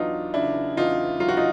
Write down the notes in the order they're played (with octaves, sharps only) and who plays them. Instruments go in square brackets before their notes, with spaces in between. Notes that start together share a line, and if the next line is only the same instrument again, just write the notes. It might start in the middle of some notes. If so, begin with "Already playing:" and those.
Already playing: [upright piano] E2 F#3 D4 D#4 F4
C#3 D4 E4
E2 D#4 F4
F#3 F4
F#4
D#4 F4